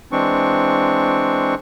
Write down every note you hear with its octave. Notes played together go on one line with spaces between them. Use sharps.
E3 G#3 C4 D4 C#6